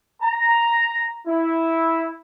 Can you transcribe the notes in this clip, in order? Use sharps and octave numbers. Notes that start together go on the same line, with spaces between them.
A#5
E4